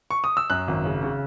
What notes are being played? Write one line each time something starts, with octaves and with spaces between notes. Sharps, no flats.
C#6
D#6
E6
F#2 F#6
G#1
C#3
C#3